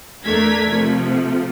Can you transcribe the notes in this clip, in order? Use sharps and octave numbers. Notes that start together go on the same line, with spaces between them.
E2 A3 D4 A#4 G#6 B6
C3 F3 A3